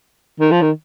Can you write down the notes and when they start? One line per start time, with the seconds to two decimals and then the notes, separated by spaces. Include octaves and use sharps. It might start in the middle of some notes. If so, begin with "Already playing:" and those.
0.40 D#3
0.51 F3
0.62 D#3